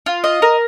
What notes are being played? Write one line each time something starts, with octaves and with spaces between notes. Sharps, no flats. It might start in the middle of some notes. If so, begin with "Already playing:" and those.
F4
D#5
A#4